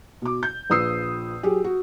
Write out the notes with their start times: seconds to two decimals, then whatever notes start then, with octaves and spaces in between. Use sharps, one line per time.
0.22 B2 D6
0.43 G6
0.70 A#1 F3 B4 D#6 E6 C7
1.43 F#3 G4 G#4
1.64 F#4